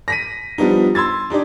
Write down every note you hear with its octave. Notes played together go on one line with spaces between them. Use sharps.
A#6 B6 D#7
F3 G3 B3 D4 D#4
C6 E6 G#6 A6
D4 D#4 G4 D5